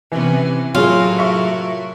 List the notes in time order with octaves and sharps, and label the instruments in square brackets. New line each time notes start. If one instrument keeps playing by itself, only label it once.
[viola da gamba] C3 B3 C#4 [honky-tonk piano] E3
[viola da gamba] A2 F#4 A#4 [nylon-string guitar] F#3 G#4 [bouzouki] F4
[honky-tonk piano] E5 C#6